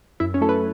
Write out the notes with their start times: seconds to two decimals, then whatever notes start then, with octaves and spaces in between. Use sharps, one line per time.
0.20 F#2 E4 E5
0.34 C#4 C#5
0.41 F#3 A3 E4 A4
0.49 B4